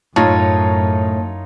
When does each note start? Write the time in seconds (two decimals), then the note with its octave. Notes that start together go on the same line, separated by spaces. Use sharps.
0.16 F#2 A2 D#4 F4 C#5 A5